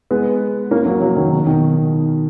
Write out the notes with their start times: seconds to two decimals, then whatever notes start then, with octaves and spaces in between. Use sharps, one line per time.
0.11 G#3 B3
0.71 A#3 C#4
0.86 F#3 A#3
1.01 F#3 A#3
1.17 D#3 F#3
1.32 B2 D#3
1.47 B2 D#3